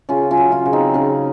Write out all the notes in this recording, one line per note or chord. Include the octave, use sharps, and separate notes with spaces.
C#3 C#4 F4
C#4 F4
F#3
C#4 F4
C#3
C4 D#4
C#3 C#4